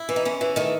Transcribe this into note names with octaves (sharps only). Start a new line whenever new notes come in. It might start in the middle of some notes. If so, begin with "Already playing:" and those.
Already playing: E4
E3
D#4
E2 C#4
E3
D#3 A3